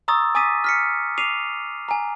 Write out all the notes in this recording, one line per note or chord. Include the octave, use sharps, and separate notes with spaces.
A#5 C#6 D#6 E6 A6
G#5 D6 D#6 A6 B6 D#7
F6 B6 C#7
D6 C7 D#7 F7
G#5 A#5